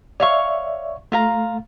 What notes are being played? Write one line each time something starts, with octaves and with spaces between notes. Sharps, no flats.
C#5 D5 E5 F5 C#6
A3 F4 F5 A#5